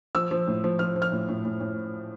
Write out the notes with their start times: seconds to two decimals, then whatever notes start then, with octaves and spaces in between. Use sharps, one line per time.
0.15 F3 E6
0.31 F3
0.47 A2
0.64 F3
0.79 F3 F6
0.96 F3
1.02 F6
1.12 A2
1.28 A2
1.45 A2
1.60 A2